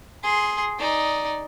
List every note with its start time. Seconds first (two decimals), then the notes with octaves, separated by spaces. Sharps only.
0.24 G#4 C6
0.79 D#4 D5